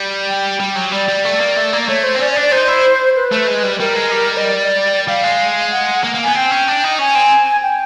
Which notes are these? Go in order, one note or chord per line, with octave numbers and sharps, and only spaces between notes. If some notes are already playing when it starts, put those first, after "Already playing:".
Already playing: G3
G5
G3
F#3
G3 D5
G3
A3
A#3
A3
A#3
A3 C#5
C5
C4
C#4 D5
D5
D4
D5
D#4 C5
E4
B4
A3
G#3
G3
G3 A#4
G#3
G3
D#5
D5
G3 F5
G#3
F#5
A#3
A#3
B3 G#5
C4 G5
C#4
D4
D#4
C#4 G#5
C4
G5